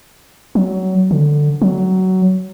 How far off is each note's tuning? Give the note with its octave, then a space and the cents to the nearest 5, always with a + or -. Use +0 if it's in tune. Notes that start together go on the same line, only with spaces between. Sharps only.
F#3 +20
D3 +10
F#3 +15